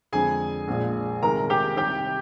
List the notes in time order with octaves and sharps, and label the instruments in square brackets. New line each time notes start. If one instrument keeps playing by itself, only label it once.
[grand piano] F2 D3 G#3 G#4 G#5
A#1 A#2 G#3
C2 C3 D#3 G#3 A#4 A#5
G4 G5
C2 C3 D#3 G4 G5